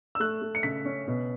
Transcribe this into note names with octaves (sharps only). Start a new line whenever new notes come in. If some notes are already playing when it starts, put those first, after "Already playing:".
E6
A3 F#6
A3
C#7
C#3 B6
C#4
B2